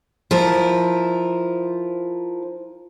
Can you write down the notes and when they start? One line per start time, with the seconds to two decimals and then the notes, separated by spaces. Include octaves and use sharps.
0.31 F3 E4 A#4